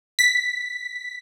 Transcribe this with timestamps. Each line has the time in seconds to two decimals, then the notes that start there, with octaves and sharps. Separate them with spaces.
0.19 B6